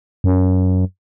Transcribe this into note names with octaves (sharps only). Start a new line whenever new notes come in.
F#2